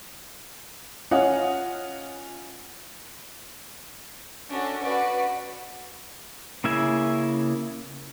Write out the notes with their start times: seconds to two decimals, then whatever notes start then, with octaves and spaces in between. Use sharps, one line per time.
1.11 C#4 F4 D#5 F#5
4.49 C#4 D4 F#4 A4
4.82 F#4 B4 D5
6.64 C#3 A#3 E4 E5 G#5